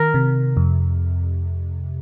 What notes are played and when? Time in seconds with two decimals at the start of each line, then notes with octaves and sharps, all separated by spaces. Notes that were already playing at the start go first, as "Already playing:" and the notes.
Already playing: D#3 A#4
0.14 C3
0.57 F2